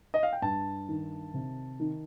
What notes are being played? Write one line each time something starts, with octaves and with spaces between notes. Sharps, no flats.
D#5
F5
G5
G2 A5
D#3
C3
D#3